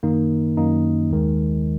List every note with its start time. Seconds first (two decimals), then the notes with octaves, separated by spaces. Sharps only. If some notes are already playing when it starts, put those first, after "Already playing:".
0.03 F#2 D#3 A#3 D#4
0.57 F#2 D#3 A#3 D#4
1.11 D#2 D#3 G#3